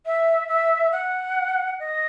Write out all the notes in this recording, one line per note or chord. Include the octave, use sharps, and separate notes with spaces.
E5
E5
F#5
D#5